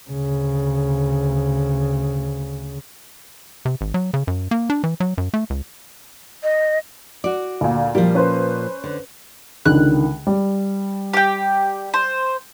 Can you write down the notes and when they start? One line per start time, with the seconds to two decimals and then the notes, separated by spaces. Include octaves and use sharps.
0.10 D2 C#3
3.65 C3
3.81 G#1
3.94 F#3
4.14 C#3
4.27 F#2
4.51 A#3
4.70 D4
4.84 E3
5.00 F#3
5.18 F#2
5.34 A3
5.50 C#2
6.43 D#5
7.24 F#4 D5
7.61 D2 A#2
7.95 A#2 F3 G3
8.15 C#4 B4 C5
8.84 D3
9.66 C#2 D3 D#3 F#6
10.27 G3
11.14 G4 G5
11.94 C5